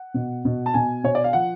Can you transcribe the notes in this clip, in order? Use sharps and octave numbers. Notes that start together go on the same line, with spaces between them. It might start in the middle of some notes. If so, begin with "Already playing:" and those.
Already playing: F#5
B2
B2
A5
B2 G#5
B2 C#5
D5
F5
F3 F#5